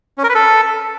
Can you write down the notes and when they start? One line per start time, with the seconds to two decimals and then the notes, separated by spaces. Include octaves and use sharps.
0.18 C#4
0.24 A#4
0.29 B4
0.35 A4